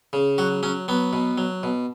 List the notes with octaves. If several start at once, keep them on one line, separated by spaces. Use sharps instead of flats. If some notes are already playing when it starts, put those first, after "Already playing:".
C#3
F#3 F#4
F#3 C#4
F#3 B3
B2
F#3
B2